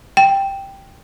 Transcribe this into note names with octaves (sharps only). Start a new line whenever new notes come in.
G5